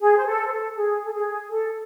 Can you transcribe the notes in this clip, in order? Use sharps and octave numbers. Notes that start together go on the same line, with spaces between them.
G#4
C5
A4
C5
A4
G#4
A4
G#4
A4